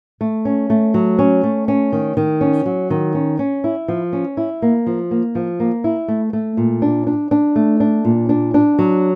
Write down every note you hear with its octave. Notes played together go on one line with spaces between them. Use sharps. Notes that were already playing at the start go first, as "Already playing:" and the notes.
A3
C#4
A3
F#3
C#4
A3
C#4
D#3
D#3
C#4
F#3
D#3
C#4
C#4
E4
F3
C#4
E4
A#3
F3
A#3
F3
A#3
E4
A3
A3
A#2
D4
D4
D4
A3
D4
A#2
D4
D4
F#3